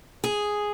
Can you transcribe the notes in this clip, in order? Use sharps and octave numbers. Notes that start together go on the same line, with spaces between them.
G#4